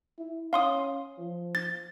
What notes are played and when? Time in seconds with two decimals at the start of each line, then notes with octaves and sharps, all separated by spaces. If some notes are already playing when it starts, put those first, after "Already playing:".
0.19 E4
0.53 C#4 F5 C6 D#6
1.18 F3
1.55 A6